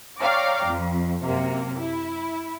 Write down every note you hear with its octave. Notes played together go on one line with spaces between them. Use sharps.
C#5 D5 F5 G5 A#5 D6
F2
F#2 C3 A#3
E4